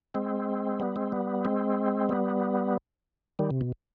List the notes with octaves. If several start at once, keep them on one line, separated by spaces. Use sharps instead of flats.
G#3 C4
G3 B3
G#3 C4
G3 B3
G#3 C4
G3 B3
D#3 G3
C3
B2